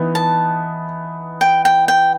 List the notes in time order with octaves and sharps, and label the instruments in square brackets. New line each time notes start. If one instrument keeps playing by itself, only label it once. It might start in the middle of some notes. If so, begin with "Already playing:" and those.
Already playing: [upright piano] E3 B3 D#4
[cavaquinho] A5
G5
G5
G5